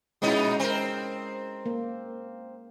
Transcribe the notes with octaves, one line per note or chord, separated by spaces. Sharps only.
A#2 G#3 B3 C#4 D#4 E4
C4 A#4
A#3